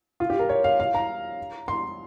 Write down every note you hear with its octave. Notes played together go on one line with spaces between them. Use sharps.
F4
G4
A#4
C#5
F5
F5
A#5
C6